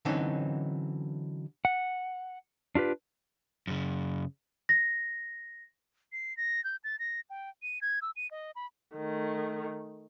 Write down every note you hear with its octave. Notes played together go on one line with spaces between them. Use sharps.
D3 E3 F#3 C4 C#4 D#4
F#5
D4 F4 G4 B4
F#2 C#3
A#6
C7
A#6
G6
A6
A#6
G5
D#7
G#6
E6
D#7
D#5
B5
D#3 A3